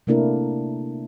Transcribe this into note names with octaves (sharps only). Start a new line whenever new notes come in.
C3 A3 A#3 D4 E4 A#4